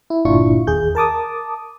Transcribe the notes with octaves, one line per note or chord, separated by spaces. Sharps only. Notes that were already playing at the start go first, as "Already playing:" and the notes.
E4
G1 A#2 D4 E4 F4 C#6
D#2 G#4 G6
A#4 A5 D6 D#6